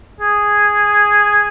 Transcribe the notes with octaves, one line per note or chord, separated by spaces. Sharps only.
G#4